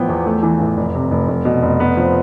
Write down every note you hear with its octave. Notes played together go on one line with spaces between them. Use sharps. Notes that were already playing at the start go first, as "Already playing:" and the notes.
Already playing: A1 F3 B3 G5
E2
A3
E3
A1
F1
C3
F1
F1
B2
F1
B3
F3